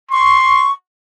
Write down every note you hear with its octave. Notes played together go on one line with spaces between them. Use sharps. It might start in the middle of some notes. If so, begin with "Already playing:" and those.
C6 C#6